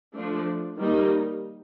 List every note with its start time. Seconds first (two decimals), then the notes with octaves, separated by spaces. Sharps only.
0.14 F3 A3 D4
0.79 D#3 G3 A#3 D#4